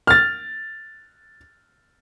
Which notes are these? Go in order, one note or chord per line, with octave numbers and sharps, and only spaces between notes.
F6 A6